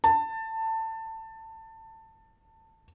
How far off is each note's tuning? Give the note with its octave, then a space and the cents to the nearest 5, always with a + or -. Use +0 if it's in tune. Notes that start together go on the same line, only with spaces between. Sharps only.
A5 +20